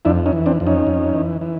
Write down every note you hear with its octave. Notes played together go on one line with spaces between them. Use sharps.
F2 D4 E4
C#4 D#4
E3
C4 D4
F2
C#4 D#4
F2
E3
E3